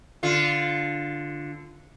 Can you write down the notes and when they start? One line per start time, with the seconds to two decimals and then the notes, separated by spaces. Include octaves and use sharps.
0.23 D3 F4